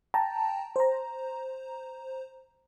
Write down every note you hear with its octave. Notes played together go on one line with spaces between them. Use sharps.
G5 A5 A#5
C5 A#5